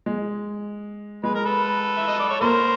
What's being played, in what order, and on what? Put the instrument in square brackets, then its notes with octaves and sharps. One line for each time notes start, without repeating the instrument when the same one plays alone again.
[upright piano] G#3
[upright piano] G#3 [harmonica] B4
[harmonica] A#4
A4 B4
E5
D#5
D5
C#5
[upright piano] A#3 [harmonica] A#4 C5